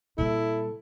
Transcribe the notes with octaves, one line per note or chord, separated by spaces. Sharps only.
A#2 G3 E4 A4